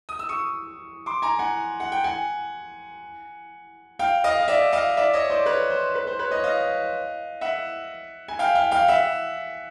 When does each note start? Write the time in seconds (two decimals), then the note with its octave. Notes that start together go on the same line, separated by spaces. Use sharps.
0.09 D#6
0.19 E6
0.29 C#6 D#6
1.06 C6 D6
1.22 G#5 A#5
1.39 F#5 G#5
1.80 F#5
1.92 G5
2.04 F#5 G#5
3.99 F5 G5
4.24 D#5 F5
4.40 F5
4.48 D5 E5
4.72 D#5 F5
4.97 D5 E5
5.14 C#5 D#5
5.30 C5 D5
5.46 B4 C#5
5.70 C5
5.95 B4
6.07 C5
6.19 B4 C#5
6.31 C#5 D#5
6.44 D#5 F5
7.41 E5 F#5
8.28 G#5
8.39 F5 G5
8.55 F5 G5
8.71 F5 G5
8.88 E5 F#5